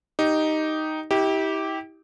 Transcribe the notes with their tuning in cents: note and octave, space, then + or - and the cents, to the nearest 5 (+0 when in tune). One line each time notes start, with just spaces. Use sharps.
D#4 +0 G4 -5
E4 -40 G4 -5